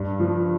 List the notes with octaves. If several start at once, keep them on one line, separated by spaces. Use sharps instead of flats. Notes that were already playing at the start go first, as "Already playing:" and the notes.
Already playing: G2
F3